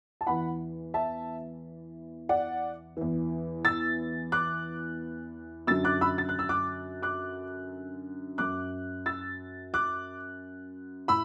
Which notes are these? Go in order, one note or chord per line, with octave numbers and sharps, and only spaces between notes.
A5
E2 E3 F#5 B5
E5 A5
D5 F#5
E2 E3
E6 A6
D6 F#6
F#2 D3 F#3 E6 A6
D6 F#6
B5 E6
A6
F#6
E6
D6 F#6
D6 F#6
F#2 F#3 D6 F#6
E6 A6
D6 F#6
A2 B5 E6